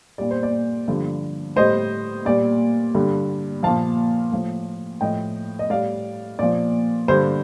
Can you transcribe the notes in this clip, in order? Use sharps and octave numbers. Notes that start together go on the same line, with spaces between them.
A#2 G3 D5
C5
D5
G2 D3 F3
A2 G3 C5 D#5
A#2 G3 D5
G2 D3 G3
A#2 F3 F5 A5
A2 F3
A2 F3 D#5 G5
D#5
A2 G3 D5 F5
A#2 F3 D5
G2 D3 G3 C5